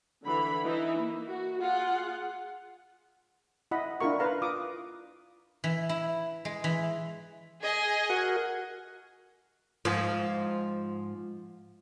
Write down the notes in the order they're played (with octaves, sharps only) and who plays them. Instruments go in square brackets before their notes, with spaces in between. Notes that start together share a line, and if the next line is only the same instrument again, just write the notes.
[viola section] D3 E3 B5
E3 D#4 E4
A#3
F#4
F4 G#4 F#5
[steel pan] E4 D#5 F#5 B5
D4 E4 F4 A#4 C#6
B4 F5 A#5
F4 D6 D#6
[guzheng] E3
E4
G#3
E3
[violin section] G#4 D#5 G#5
[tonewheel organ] F#4 A#4 F#5
[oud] G#2 F3